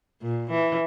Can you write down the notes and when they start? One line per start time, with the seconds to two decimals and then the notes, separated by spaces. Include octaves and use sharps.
0.22 A#2
0.50 E3